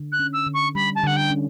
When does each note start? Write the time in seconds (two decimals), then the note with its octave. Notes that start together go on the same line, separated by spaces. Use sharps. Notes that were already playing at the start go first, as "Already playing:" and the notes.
Already playing: D3
0.12 F#6
0.19 C#4
0.33 E6
0.46 D3
0.54 C#6
0.75 G3 B5
0.95 A5
1.03 D3 F#5
1.16 G5
1.30 C#4